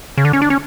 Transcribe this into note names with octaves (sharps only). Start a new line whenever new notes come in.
C#3
D3
C#4
D4
C#4